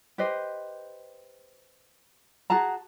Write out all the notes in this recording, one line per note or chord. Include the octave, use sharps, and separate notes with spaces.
G4 B4 C5 D#5
F#4 G#4 A5 A#5